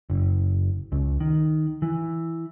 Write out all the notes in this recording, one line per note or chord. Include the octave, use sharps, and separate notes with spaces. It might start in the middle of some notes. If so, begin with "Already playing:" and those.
F#1
C#2
D#3
E3